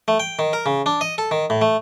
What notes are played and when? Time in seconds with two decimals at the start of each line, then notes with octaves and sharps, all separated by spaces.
0.08 A3
0.20 G5
0.39 D#3
0.53 A#4
0.66 C#3
0.86 D4
1.01 D#5
1.18 A4
1.31 D#3
1.50 A2
1.61 A3